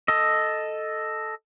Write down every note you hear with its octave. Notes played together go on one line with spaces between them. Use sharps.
A4 D#5